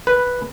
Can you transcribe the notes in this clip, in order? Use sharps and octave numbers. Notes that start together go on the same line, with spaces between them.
B4